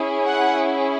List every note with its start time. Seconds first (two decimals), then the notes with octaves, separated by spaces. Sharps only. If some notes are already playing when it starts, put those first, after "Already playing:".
Already playing: C#4 E4 G#4
0.25 F#5